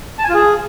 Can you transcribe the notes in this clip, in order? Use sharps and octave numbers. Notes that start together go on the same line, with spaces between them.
A5
G#5
F4
G#4